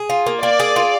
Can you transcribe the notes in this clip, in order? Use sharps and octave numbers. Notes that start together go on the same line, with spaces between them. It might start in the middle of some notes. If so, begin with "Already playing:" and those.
Already playing: G#4
F4
A#3
A#3 D5
G#4
F4